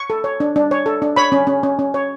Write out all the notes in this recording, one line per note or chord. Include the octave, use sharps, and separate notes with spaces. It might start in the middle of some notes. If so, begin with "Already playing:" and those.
Already playing: C#6
A4
C#5
D4
D4
C#5
A4
D4
C#5 B5
C#4
C#4
C#4
C#4
C#5